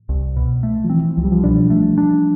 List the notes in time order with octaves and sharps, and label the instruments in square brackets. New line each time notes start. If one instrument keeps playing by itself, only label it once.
[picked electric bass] C2
B2
A3
[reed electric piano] F3
[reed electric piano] E3 [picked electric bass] C4
[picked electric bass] C2 [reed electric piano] F3
[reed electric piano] G3
F3
[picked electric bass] B2 [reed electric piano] D4
[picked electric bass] A3
D4